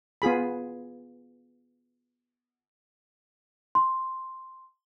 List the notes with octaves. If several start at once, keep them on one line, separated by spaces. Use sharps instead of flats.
B3 F4 G#4 B5
C6